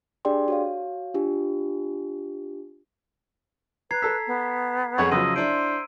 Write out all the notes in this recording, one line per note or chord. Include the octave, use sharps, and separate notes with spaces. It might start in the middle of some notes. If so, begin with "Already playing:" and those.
D4 G4 G#4 D5 G5 C6
F#4 C#5 F5
D4 F4 G4
B4 A#5 G#6 C7
A4 E6 B6
B3
F2 G#4 C#5 F#5
C#3 F3 F#3 D#5 C6 E6 D#7
D4 E4 C5 D7